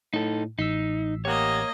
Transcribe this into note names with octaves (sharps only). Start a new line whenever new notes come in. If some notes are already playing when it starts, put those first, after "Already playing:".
A2 D#4 A4
A1 D#4 E6 B6 C7
A#3 G4 C#5 D#5 F#5